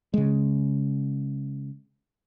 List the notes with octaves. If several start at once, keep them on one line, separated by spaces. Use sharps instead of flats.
C#3 G#3